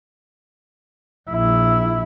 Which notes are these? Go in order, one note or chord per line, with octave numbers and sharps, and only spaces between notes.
A#1 E4